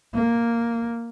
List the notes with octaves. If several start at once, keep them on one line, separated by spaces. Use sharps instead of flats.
A#3